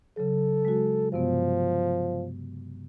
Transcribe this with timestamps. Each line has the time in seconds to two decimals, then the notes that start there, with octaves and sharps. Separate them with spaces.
0.17 C#3 F#3 A4
0.65 G#3 F#4
1.12 G2 C3 F3 B3